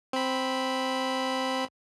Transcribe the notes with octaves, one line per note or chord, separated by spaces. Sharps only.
C4 B5